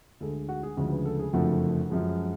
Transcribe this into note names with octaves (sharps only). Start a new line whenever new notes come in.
D2 D3 G#3 A4
F#4
G#4
D2 C#3 F3 G#3 F#4
B4
A4
G#4
F#1 F2 D3 F3 A3 F#4
F#2 F3 G#3